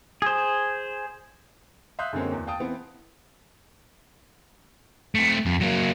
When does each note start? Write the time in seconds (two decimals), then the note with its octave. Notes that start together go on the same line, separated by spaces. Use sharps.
0.22 G#4 C5
1.99 E5 F5 C6 D#6 F#6 G6
2.13 F#2 D3 G#3 A#3 C4 C#4
2.32 E2
2.47 F5 G5 A5 D#6 D7
2.60 E3 B3 C4
5.15 A3 C4
5.46 F2
5.61 F#3 A#3